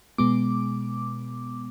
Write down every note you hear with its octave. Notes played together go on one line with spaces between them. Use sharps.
B2 G#3 B3 D6